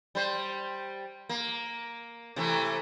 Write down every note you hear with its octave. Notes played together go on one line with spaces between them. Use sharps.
G3 C5
A#3
C3 E3 A3